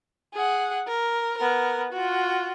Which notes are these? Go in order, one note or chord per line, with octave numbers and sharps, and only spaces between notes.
G#4 F#5
A#4
B3 A#4
F4 F#4